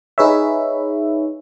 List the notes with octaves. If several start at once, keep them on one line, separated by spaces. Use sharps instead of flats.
D#4 G#4 B4 C#5 E5